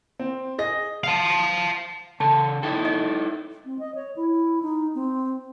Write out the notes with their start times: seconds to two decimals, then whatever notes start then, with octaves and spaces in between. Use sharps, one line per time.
0.20 C4
0.58 G#4 D#5 A#6
1.04 F5 A5
2.20 C#3 A4 A5
2.63 D#4 E4 A4 G5
2.85 D#5
3.66 C4
3.79 D#5
3.95 C#5
4.16 E4
4.62 D#4
4.95 C4